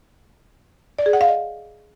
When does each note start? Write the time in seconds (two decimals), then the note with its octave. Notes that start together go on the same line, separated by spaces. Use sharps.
0.99 D5
1.06 G#4
1.13 F#5
1.21 F5
1.28 D#5